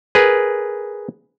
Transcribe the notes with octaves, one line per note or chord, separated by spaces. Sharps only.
G#4 A#4 B4